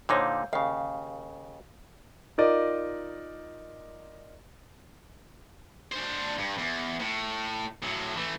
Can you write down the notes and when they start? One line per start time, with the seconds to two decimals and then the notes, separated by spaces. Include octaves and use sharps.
0.09 A#2 D3 D#4 C5 C#5 F5
0.53 D#2 C#3 F5
2.38 D#4 F4 A#4 D5 D#5 D6
5.92 D4 C5
6.38 G2
6.58 E2
7.00 A2
7.83 A2 F#3
8.15 E3 A3